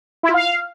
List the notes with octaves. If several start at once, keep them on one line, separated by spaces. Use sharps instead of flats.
E4
F4
F5